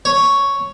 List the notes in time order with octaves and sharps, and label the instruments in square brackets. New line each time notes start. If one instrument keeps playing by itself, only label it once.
[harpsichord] C#5